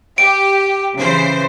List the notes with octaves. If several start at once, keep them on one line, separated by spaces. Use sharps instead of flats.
G4 D7
C#3 E3 C5